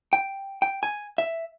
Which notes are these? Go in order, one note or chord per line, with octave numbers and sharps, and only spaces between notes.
G5
G5
G#5
E5